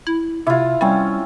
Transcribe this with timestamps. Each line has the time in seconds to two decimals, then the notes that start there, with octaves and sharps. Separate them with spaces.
0.07 E4
0.47 C3 E4 F4
0.81 G3 C4 C#4